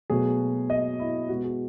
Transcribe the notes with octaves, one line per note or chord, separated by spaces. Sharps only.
B2 F#3 A3 G#4
D#5
E4
B2 G#3 B3 F#4
G#4